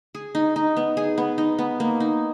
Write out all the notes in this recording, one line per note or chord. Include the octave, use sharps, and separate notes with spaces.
G#4
D#4
D#4
B3
G#4
B3
D#4
B3
A#3
D#4